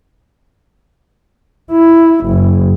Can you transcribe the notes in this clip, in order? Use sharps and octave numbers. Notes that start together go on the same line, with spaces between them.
E4
F#1